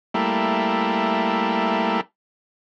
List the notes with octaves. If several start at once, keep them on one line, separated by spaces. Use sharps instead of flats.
G3 A3 A#3 E4